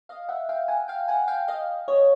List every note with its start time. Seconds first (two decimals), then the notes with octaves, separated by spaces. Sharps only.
0.09 D#5 F5
0.29 E5 F#5
0.49 F5 G5
0.68 F#5 G#5
0.88 F5 G5
1.08 F#5 G#5
1.28 F5 G5
1.48 D#5 F5
1.88 C#5 D#5